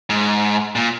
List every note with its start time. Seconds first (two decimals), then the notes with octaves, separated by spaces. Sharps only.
0.10 G#2
0.75 A#2